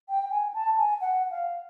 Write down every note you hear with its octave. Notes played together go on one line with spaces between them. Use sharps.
G5
G#5
A5
G#5
F#5
F5